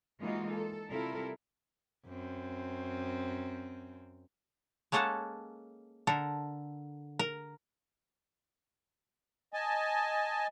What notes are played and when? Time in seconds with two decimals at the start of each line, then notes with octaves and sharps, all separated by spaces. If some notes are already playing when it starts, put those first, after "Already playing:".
0.19 E3 G#3 A#3 D#4 F4 F#4
0.51 A4
0.89 C3 G3 E4 F4 A4 A#4
2.06 F#2 C4
4.92 G#3 A#3 C#4 A4 F#5 A5
6.07 D3 A4 A#4
7.19 A#4
9.54 D#5 G#5 A5